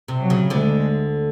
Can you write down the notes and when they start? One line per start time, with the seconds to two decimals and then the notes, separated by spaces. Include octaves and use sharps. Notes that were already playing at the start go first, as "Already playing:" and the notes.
0.08 C3
0.19 F#3
0.30 C#3
0.50 D2 D3 G#3